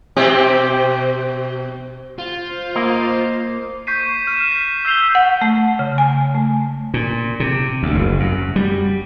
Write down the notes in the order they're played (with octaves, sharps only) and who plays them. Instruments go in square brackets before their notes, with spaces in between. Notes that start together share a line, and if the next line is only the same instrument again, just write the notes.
[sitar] B2 C4 G4
[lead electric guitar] F4 [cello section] C5
[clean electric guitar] A#3 A#4 D#5
[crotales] C#6 G6 B6 C7 D#7
F6 D#7 E7
B6
E6 G6 B6 C7 F7 G7
[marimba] F#5
A3
C#3
G#5
A3
[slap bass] A#2
C3
D2
F#1
F#2
G3